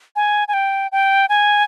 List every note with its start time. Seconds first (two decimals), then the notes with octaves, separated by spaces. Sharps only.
0.16 G#5
0.48 G#5
0.54 G5
0.92 G5
1.29 G#5